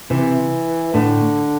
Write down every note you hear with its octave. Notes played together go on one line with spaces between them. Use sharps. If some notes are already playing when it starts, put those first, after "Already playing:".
C3 E3
A2 D3